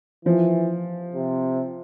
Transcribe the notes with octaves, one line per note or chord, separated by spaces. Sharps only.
E3 F3
C3